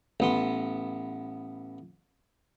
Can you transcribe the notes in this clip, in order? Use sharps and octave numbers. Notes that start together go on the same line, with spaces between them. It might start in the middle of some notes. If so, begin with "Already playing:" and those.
A1 B3 C6